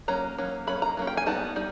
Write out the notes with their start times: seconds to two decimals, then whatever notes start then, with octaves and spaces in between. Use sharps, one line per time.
0.08 F#3 A#3 C#4 A#5
0.38 F#3 A#3 C#4
0.67 F#3 A#3 C#4 B5
0.82 A#5
0.97 F#3 A#3 C#4
1.07 G5
1.17 G#5
1.26 G3 B3 D#4 A5
1.56 G3 D#4